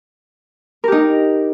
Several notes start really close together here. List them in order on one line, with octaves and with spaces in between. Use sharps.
A#4 G4 D#4